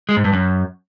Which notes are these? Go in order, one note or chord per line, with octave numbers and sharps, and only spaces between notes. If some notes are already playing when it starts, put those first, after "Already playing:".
G#3
G#2
G2
F#2